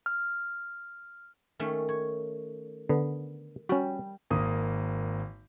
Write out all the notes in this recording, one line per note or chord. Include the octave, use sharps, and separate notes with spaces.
F6
D#3 A3 C#4
C#5
D3 B3
G3 C#4 F#4
G#1 A#3 D#6